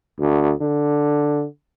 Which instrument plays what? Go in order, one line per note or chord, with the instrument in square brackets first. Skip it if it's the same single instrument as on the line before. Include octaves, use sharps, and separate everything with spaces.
[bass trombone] D2
D3